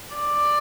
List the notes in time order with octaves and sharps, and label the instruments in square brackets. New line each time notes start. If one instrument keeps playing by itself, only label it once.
[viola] D5